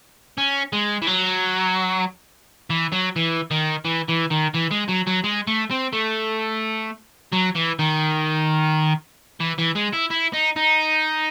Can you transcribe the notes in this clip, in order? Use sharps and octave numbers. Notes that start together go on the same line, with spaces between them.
C#4
G#3
E3
F#3
E3
F#3
E3
D#3
E3
E3
D#3
E3
G#3
F#3
F#3
G#3
A3
C4
A3
F#3
E3
D#3
E3
E3
G#3
E4
E4
D#4
D#4